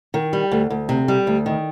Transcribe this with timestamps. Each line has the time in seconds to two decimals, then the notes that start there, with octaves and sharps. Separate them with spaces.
0.14 D#3
0.33 G3
0.51 D2
0.70 D2
0.89 C3
1.08 G3
1.27 D2
1.46 D#3